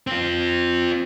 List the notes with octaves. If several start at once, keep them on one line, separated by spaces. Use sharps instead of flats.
C4 F4